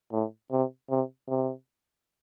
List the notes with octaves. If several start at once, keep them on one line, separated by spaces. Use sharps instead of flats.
A2
C3
C3
C3